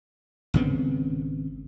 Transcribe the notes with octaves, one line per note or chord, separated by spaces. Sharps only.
G#1 C#3 B3 C4